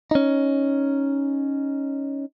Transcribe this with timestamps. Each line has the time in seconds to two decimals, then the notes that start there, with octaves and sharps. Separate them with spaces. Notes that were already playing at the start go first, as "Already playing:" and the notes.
0.11 C#4 D#4